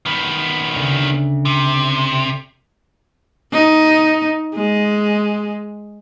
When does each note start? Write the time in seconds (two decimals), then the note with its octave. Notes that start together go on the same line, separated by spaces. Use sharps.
0.06 D#3 B3
0.75 D2 C#3
1.45 C3
3.53 D#4
4.55 G#3